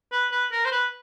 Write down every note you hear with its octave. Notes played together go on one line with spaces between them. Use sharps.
B4
B4
A#4
C5
B4